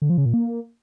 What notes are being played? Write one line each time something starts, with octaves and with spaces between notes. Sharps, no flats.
D3
F3
C#3
A#2
A#3